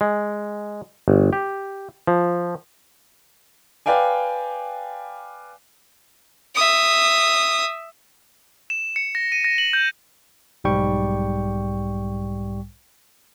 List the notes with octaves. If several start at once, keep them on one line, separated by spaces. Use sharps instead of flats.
G#3
G1
G4
F3
B4 D5 F5 G5 G#5
E5 D#6
E7
C#7
A#6
D#7
A#6
F#7
G6
B1 G#2 G3 G5 C#6